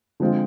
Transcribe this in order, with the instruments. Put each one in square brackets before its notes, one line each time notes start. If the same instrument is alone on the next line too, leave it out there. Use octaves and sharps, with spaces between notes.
[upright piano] D3 F3 G#3 C4 F4